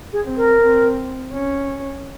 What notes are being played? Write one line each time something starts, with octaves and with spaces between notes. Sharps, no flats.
G#4
C4
A#4
C4
C#4